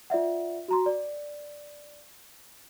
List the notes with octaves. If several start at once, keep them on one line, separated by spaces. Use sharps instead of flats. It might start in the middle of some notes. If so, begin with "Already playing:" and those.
F4 D5 E5 F#5
F#4 A#5 C6
D5